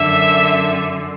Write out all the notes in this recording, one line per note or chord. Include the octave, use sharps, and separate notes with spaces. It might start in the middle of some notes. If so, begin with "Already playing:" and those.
Already playing: F#2 D3 E5